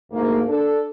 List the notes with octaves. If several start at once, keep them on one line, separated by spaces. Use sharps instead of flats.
D2 G#2 A#3
D4 A4